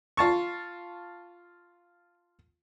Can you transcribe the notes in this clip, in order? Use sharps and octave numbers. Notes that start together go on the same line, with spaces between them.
F4 A5 C#6